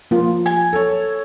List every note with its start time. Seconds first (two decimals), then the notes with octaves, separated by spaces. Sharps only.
0.11 F3 A#3 F4
0.46 G#5
0.73 A4 C#5